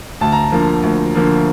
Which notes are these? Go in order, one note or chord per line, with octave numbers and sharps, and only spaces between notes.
D2 A5
A#5
A5
D3 F3 A#3
D2
D3 F3 A#3